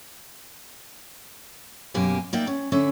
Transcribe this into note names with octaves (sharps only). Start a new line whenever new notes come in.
F#2 B2 A#3 G4 G#5
A#3 D#4 D5 E5 G5
C#4
D3 C#4 E5